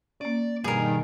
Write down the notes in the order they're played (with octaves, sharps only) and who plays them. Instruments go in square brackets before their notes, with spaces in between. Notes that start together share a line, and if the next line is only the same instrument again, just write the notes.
[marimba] A#3 C#4 [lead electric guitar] D5
[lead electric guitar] G2 [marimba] B2 F3 [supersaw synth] D#3 [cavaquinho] G#4 A#4